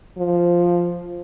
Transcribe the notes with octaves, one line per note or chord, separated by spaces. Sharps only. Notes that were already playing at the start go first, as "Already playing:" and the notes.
F3